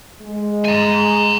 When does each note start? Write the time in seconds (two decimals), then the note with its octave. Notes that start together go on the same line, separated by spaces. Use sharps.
0.22 G#3
0.65 G#5 A#5